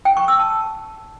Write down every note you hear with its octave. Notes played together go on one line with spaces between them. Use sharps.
G5
C#6
E6
A5